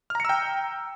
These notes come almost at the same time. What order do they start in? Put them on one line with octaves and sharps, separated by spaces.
F6 A#5 C#7 E6 G5